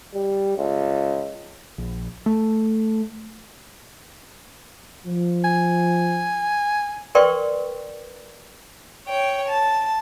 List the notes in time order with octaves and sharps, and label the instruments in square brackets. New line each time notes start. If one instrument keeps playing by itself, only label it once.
[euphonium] G3
C#2
[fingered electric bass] A#1
A3
[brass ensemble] F3
[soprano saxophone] G#5
[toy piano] A#4 B4 D5 G5 C6 C#6
[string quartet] C#5 G5
A5